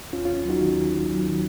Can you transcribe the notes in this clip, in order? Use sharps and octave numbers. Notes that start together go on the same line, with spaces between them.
D#2 C#4 F4
C#4 F4
D#2
F#3 D#4 F#4
D#3
D#2
D#2
F#3
D#3